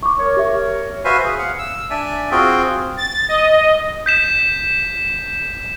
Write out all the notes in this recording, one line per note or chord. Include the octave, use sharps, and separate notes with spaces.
C#6 D6
A#4 C#5
G4 E5
F#4 B4 C5 E5 F5 G#5
G#4
F5 F#5
E6
D4 D5 E5 G#5
C4 F4 F#4 G#4 G5
A6
D#5
G6 B6 E7